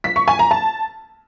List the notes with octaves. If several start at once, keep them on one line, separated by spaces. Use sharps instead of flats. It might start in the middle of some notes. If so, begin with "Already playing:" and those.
B6
C#6
G#5
A#5
A5